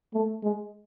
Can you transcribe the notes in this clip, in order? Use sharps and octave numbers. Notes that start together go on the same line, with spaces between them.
A3
G#3